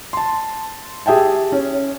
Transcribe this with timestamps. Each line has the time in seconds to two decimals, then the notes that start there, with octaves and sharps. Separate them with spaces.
0.13 A5 C6
1.06 G4 G#4 E5 G5 A5
1.52 C#4